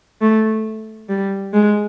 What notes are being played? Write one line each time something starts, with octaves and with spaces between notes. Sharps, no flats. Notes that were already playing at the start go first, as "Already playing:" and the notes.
A3
G3
G#3